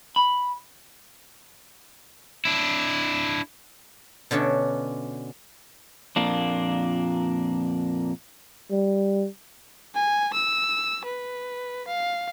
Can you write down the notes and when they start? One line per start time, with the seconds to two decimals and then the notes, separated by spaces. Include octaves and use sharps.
0.16 B5
2.45 D4 E4
4.31 B2 D3 C#4 D4 E5
6.16 F2 A#2 A#3 D4
8.71 G3
9.95 G#5
10.34 E6
11.05 B4
11.87 F5